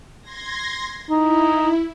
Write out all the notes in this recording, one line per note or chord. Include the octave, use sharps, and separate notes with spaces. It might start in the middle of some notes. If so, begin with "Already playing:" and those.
C6 G#6 A#6
D#4 E4